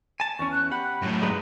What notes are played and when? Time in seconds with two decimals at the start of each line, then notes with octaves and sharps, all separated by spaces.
0.20 G#5 A5
0.39 E2 C#4 C#6
0.52 F#6
0.71 G4 F#5 B5
1.02 F#2 A2
1.22 G2 G#3 B4 A#5